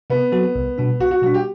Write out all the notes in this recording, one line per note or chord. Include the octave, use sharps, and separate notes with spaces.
C3 B3
F#3 C4 F#4 A4
C2
B2 G3 D4
C2 F#4
F#4
B2 G3 D4 F#4
G4